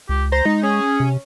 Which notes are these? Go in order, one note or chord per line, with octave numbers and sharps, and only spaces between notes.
C#2 G4
C5 A#5
G#3 D#4
C#4 G#4
C3